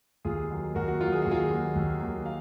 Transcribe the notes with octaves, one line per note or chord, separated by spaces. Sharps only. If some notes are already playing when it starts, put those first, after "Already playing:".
D#2 F4 G#4
D#3 F#3 A#3
D#2 F#4 A#4
F#4
D#3 F#3 A#3 F4
G#4
D#2 F#4
F4 G#4
D#3 F#3 A#3
D#2
D#3 F#3 A#3
F5